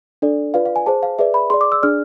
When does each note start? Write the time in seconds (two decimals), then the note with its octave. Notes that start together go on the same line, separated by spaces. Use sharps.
0.22 D4 A4 D5
0.54 F4 B4 D5 F5
0.66 F5
0.76 G#5
0.86 G#4 C5 A5
1.03 F5
1.19 G#4 B4 D5 E5
1.34 B5
1.50 G#4 D5 C6
1.61 D6
1.72 E6
1.82 D4 G#4 D5 F6